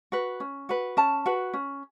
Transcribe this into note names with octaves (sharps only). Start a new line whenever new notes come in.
F#4 B4
C#4
F#4 B4
C#4 A5
F#4 B4
C#4